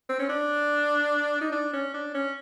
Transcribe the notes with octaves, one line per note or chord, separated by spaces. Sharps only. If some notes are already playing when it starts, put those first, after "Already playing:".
C4
C#4
D4
D#4
D4
C#4
D4
C#4